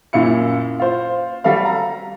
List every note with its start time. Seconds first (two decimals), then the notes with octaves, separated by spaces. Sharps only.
0.13 F#2 A#2 E4 F5 C#7
0.79 F4 C5
1.44 F#3 G3 A4 F5
1.65 A#5